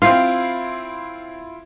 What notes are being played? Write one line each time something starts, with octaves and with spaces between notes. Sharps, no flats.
C4 E4 F4 F5 C6